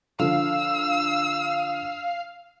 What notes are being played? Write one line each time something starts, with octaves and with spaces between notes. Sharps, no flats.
D3 F3 F5 E6